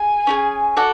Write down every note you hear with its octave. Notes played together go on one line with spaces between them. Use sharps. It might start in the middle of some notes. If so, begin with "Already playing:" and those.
Already playing: G#4 G#5
C#4 E4 G#4
F#4 A4 D5 F#5